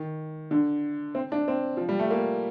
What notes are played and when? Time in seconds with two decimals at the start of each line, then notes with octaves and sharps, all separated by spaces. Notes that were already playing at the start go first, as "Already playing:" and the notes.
Already playing: D#3
0.51 D3
1.15 C4
1.32 D4
1.48 C4
1.77 F3
1.89 G3
1.99 A3
2.10 A#3